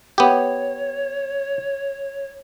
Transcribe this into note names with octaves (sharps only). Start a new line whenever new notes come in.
B3 G4 C#5